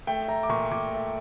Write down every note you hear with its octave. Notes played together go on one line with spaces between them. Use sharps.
A3 G5
A3 A#5
D6
A#2 C#6
C#6
A#2 D6
A3